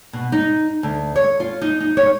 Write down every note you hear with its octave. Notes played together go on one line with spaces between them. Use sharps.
B2
D#4
D2
C#5
F4
D#4
D#4
C#5